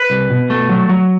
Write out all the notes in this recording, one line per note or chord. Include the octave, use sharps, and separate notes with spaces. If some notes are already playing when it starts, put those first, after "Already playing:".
Already playing: B4
C2
B2
A3
F#3
F#3